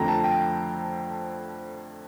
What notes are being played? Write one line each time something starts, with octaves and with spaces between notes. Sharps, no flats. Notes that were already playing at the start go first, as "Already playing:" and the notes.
Already playing: F2 D3 F3 A3 C4 G5 A#5
A5
G5